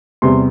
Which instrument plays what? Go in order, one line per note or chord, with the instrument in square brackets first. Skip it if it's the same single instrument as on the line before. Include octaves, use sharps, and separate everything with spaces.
[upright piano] E2 C3 G3 C6